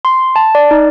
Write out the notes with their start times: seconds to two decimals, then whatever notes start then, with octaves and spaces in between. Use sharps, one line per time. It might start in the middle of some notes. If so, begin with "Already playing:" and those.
0.05 C6
0.36 A5
0.55 D5
0.71 D#4